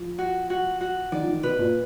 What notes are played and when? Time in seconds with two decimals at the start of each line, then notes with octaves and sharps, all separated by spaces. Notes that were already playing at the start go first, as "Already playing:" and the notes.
Already playing: F3
0.19 F#4
0.50 F#4
0.81 F#4
1.12 D#3 D5
1.22 F3
1.28 D#3
1.43 B2 B4
1.59 A#2